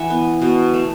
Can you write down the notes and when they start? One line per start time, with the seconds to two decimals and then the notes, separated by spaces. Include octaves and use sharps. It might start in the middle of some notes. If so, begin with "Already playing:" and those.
Already playing: E3 B4 E5 F#5
0.10 B3
0.42 B2
0.74 A3